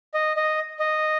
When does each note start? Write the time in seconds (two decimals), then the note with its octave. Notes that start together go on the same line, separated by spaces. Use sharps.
0.14 D#5
0.37 D#5
0.79 D#5